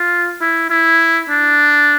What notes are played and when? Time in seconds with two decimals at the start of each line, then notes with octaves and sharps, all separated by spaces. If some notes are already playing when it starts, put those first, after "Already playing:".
Already playing: F4
0.41 E4
0.70 E4
1.30 D4